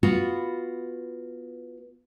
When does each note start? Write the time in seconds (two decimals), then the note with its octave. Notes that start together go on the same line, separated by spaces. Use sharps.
0.03 B3 F4 F#4